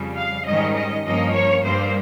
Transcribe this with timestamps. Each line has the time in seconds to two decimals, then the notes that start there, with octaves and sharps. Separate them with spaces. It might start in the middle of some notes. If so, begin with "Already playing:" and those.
Already playing: F2 C#3 G3
0.16 F5
0.45 G#2 D#3 G3 C#4 D#5
0.75 D#5
1.04 G2 F3 A#3 C#4 D#5
1.34 C#5
1.63 G2 G3 A#3 C5